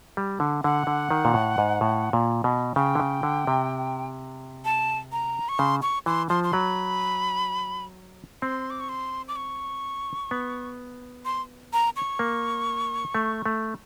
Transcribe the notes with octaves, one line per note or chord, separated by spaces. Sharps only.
G3
D3
D3 F#5
D3
D#3
A#2
A2
G#2
A2
A#2
B2
C#3 G5
D3
C#3
D3
C3
A5
A#5
C#6
C#3 C6
C#6
E3 C6
F3 C6
C6
F#3 B5
C4 C6
D6
C#6
C6
D6
C#6
B3
C6
A#5
C#6
A#3
A3
A3